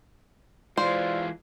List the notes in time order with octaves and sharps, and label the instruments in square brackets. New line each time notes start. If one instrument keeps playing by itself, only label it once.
[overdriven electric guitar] E3 G#3 [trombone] F4 [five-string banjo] C5 [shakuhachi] D5